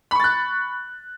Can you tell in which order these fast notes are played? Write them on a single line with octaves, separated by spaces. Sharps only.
B5 C#6 A6 F#6